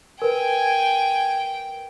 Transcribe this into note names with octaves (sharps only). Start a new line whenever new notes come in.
A#4 B4 G5 G#5